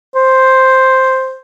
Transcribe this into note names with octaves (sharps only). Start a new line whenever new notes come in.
C5